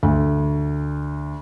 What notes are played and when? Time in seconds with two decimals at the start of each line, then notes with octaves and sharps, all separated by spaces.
0.03 D2